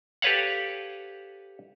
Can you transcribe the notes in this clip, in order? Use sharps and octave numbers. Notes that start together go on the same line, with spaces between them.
G4 A4 B4 C#5 F5 F#5